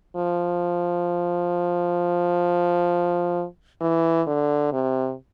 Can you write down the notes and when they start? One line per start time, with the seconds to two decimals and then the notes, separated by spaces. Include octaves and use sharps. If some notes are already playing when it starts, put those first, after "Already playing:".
0.16 F3
3.81 E3
4.27 D3
4.72 C3